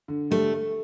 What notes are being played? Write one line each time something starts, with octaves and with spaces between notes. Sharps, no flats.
D3
G3 A3